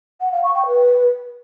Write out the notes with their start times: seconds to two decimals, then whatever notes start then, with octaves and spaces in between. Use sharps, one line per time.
0.21 F#5
0.32 F5
0.44 C#6
0.55 G5
0.67 B4